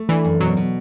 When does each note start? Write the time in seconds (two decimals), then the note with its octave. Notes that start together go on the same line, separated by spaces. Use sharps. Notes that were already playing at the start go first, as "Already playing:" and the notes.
Already playing: A3
0.09 E3 D4
0.25 F#2
0.40 B2 F#3
0.57 B2